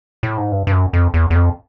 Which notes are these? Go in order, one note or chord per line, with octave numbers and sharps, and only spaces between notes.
A2
G#2
G2
G2
F#2
F2
E2
E2
F2